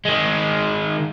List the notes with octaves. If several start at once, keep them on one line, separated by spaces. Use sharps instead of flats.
D#3 G#3